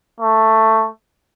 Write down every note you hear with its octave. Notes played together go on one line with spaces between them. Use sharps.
A3